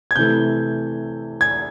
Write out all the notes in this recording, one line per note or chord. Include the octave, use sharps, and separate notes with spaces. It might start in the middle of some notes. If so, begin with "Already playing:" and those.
G#6
C3 E3 A3 G6
G#6